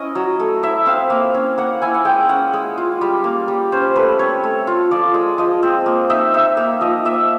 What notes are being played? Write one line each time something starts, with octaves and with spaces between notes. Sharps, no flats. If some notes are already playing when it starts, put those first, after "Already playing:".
Already playing: C#4 E4 D#5
F#3
A3
E4 E5
C4 F5
A#3
C#4
A#3 F#5
E4 G#5
F#5
G#3 G5
C#4 F#5
G#3
F4
G3
A#3
G3
C#4 C5
A3 B4
C4 C#5
A3
F4
F3 D5
G#3
F3 D#5
C4
A#3
D#4 E5
D#4 E5
A#3
F3 D#5
A#3 E5